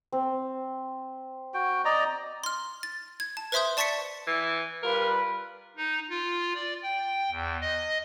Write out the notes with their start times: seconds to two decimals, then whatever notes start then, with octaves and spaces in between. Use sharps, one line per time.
0.12 C4
1.54 F#4 G5
1.85 D5 D#5 A#5
2.44 C6 F6
2.83 A6
3.20 G#6
3.37 A5
3.52 B4 C5 E5 C6 D#6 G6
3.77 D5 A5 C#6 A6 B6 C#7
4.27 E3
4.83 G3 F4 A#4 B4
5.77 D#4
6.10 F4
6.55 D5
6.83 G5
7.31 E2
7.61 D#5